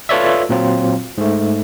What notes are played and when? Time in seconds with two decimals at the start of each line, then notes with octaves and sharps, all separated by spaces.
0.09 F4 A4 B4 C#5 D5 E5
0.49 A#2 F#3 C4 F4
1.18 G#2 A3